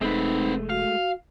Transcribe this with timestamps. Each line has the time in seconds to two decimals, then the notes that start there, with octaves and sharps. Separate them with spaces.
0.01 E1 G#3 A3 C4 D#4 B4
0.70 F#4 F5